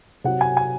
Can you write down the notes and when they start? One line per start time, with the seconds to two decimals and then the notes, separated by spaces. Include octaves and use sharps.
0.24 C3 F#3 F#5
0.41 G#5
0.57 G#5